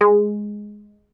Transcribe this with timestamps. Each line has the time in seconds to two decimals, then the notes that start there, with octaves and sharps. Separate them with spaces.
0.01 G#3